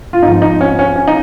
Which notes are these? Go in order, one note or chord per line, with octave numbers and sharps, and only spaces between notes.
F4
G#2 F3 D#4
D#4
C#4
C#4
C#4
D#4